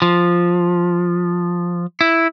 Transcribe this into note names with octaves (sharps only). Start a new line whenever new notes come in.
F3
E4